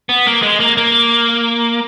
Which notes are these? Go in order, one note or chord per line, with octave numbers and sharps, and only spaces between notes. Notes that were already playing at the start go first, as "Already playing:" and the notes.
B3
A#3
G#3
A#3
A#3